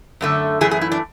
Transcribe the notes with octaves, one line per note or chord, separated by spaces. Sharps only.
F#2 D3 A3
F#2 E3 A3 G#4
G#4
E4
D4